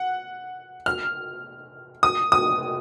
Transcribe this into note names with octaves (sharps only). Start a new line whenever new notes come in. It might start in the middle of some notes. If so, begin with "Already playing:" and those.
Already playing: F#5
F6
D#6
D#6